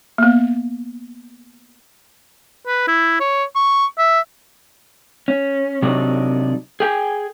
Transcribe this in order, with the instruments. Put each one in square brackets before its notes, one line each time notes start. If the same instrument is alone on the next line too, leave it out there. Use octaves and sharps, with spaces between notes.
[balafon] A#3 B3
[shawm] B4
E4
C#5
C#6
E5
[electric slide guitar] C#4
C3 F#3 D4 D#4
G#4 G5 G#5